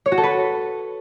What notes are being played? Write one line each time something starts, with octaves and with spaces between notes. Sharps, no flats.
C#5
F#4
A4
B4